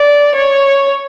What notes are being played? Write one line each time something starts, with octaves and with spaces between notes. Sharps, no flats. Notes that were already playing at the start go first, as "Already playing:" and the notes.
Already playing: D5
C#5